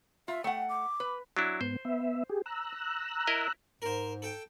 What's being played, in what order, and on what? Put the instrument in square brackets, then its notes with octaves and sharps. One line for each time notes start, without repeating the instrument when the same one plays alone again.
[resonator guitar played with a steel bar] F4 [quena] E5
[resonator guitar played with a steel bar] A3 F#5 [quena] G5
[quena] D6
[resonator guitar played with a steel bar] B4
[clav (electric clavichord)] F#3 D4 E4
[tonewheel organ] G#2 B3 [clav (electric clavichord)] C5
[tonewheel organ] B3 E5
G4 G#4
A#5 E6 F#6
[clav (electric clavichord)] E4 A#4 D#5
[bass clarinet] G#2 [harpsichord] A#4 C5
[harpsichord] A4 G5